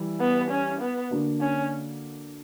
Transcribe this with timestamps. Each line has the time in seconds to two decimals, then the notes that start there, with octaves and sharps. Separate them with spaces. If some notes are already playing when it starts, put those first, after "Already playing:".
Already playing: E3 G3 E4
0.20 B3
0.50 C#4
0.81 B3
1.11 D3 A#3 D4 F#4
1.41 C#4